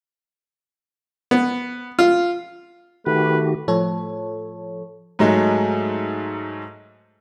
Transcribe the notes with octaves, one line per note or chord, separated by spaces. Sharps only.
B3
F4
D#3 A3 F#4 G4 B4
A2 F3 A4 C#5
G#2 F#3 G#3 A3